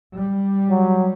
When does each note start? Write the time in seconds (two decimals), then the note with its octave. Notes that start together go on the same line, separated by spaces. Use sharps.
0.16 G3
0.69 F#3